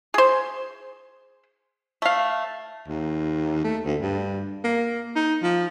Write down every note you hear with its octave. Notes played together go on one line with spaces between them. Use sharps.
G#4 C5
A3 F5
D#2
A3
D2
G2
A#3
D#4
F3